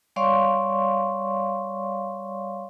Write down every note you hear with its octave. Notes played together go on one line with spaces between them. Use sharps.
G3 C#5 D5 F5 C6 C#6